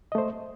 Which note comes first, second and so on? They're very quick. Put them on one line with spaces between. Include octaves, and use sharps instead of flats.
D#5 A3 C5